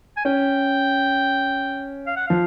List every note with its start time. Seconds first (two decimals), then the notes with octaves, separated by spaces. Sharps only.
0.17 G#5
0.25 C#4 G5
2.07 F5
2.16 F#5
2.27 F3 F5